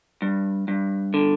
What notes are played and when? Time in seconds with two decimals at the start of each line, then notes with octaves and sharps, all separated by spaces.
0.22 G2
0.68 G2
1.14 D3